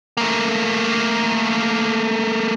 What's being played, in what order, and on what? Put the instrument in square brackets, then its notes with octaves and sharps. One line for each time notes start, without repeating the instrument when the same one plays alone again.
[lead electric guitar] A3 A#3